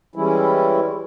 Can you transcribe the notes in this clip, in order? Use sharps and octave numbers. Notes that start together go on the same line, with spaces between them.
E3 G3 G#3 C#4 E4